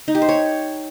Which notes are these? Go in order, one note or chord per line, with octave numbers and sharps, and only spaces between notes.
D#4
G4
C5
C#5